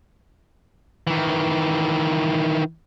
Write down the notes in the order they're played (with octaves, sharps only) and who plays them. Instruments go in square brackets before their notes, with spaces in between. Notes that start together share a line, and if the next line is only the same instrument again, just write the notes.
[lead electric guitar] D#3 E3